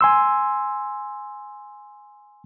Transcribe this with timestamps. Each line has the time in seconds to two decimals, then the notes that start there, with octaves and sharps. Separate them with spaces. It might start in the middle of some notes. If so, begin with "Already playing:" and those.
0.01 G#5 C6 E6